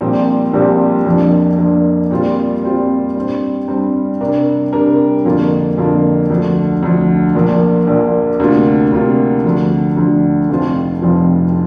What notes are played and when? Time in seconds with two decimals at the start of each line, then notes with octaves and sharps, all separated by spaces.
0.01 A#1 A#2 G3 C4 G4
0.54 A#1 A#2 G3 C4 G4
1.06 F2 F3 A#3 D4
1.58 F2 F3 A#3 D4
2.11 A#2 G3 C4 F4
2.63 A#2 G3 C4 F4
3.16 G2 G3 C4
3.68 G2 G3 C4
4.21 C3 G3 D4 A#4
4.73 C3 G3 D4 A#4
5.25 F2 D3 A#3 F4
5.78 F2 D3 A#3 F4
6.30 D2 D3 F3
6.82 D2 D3 F3
7.35 A#1 A#2 F3 A#3
7.87 A#1 A#2 F3 A#3
8.40 D2 C3 A#3 F4
8.92 D2 C3 A#3 F4
9.44 D2 D3 F3
9.97 D2 D3 F3
10.49 F1 F2 F3 C4 F4
11.02 F1 F2 F3 C4 F4